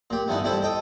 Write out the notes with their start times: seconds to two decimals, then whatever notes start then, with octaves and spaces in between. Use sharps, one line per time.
0.10 A#2 G4
0.28 G2 D3 E3 B3 D#4
0.44 E3 G3 E4 A4 C5
0.62 A4 D#5 G5